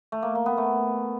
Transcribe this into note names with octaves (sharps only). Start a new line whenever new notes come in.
A3
A#3
A#3
B3
A3